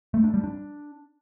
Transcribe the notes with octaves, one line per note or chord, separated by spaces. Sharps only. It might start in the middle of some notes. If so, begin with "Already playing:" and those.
A3
D4
G3
D4